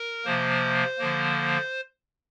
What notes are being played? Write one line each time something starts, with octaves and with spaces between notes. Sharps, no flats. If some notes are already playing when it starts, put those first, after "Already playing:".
Already playing: A#4
C3 F3 A#3 C5
D3 F3 A#3